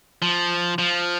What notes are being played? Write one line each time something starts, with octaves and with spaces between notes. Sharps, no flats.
F3
F3